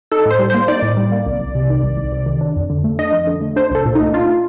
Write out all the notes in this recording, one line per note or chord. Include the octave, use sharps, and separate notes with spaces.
D#4 A4
A2 C5
G3
A#3 C5
D#4 D5
A2
G3
A#3
C2
C2
C3
D#3
C2
C2
C3
D#3
D4
F2
D3
A3
D4 D#5
F2
D3
A3
D4 C5
C2 A4
A#2
A3 D#4
D4 F4